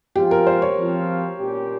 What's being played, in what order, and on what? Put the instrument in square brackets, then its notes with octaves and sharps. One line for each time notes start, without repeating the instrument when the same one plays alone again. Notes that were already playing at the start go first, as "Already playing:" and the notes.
[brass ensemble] F3 G#3 C4 F4 [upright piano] G4
[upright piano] A#4
C5
C#5
[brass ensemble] F3 C4 F4
A#2 G3 C#4 G4